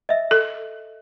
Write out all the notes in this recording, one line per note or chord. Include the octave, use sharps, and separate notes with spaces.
D#5 E5
A4